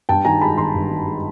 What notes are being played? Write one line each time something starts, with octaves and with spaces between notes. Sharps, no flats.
G2 G5 A5
D#3 G#5 A#5
G#3 A5 B5
G#1 A#5 C6
G2
D#3
G#3